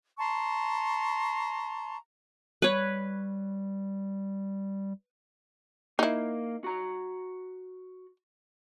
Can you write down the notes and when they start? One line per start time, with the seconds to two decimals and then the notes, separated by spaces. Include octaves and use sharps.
0.19 A5 A#5 C6 C#6
2.62 G3 B4 C#5
5.99 A#3 D#4 E4
6.64 F#4 A#5